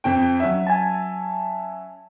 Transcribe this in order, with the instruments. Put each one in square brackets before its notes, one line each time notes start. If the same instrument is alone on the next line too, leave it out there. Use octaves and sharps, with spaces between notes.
[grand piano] F2 C4 G5
F#3 C#4 E5
[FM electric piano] G#5 A5